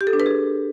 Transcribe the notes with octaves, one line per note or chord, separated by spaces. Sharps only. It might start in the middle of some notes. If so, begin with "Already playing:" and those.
G4
A4
D4
B4
G#4